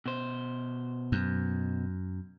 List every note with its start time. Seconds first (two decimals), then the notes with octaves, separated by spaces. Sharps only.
0.06 B2 C5
1.12 F#2